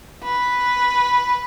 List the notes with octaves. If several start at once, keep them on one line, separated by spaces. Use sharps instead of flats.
B4